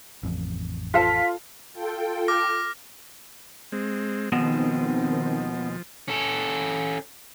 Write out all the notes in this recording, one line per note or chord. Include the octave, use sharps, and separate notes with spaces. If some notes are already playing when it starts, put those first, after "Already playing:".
A1 F2
F4 A4 C5 F5 A5 B6
F4 A4 G5
D6 F6 A#6
G#3 C4
D#2 B2 D#3 F3 G#3 B3 C4
C#4 A4